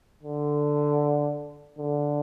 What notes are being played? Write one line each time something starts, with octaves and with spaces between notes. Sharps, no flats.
D3
D3